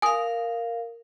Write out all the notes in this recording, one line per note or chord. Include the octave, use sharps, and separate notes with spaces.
A#4 F5 G#5 D#6